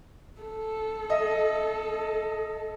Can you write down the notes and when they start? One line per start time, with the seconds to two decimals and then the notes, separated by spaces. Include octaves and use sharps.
0.41 A4
1.10 D#5 E5